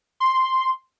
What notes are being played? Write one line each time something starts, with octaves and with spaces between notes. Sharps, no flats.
C6